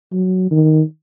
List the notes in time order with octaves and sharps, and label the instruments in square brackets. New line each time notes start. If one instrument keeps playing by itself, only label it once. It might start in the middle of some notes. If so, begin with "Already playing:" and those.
[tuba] F#3
D#3